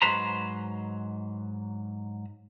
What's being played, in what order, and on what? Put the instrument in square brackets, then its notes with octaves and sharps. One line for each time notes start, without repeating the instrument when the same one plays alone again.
[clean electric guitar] G#2 F#3 B4 C5 A#5